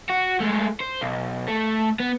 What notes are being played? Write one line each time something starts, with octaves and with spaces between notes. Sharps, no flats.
F#4
G#3 A3
C5
B1
A3
B3